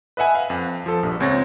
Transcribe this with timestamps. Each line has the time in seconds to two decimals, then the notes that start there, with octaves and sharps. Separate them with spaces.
0.17 B4 D#5 E5 F#5 G#5
0.35 F5
0.50 F2
0.86 F3 A4
1.03 A#1 G2
1.20 C#2 C4 C#5 A6 A#6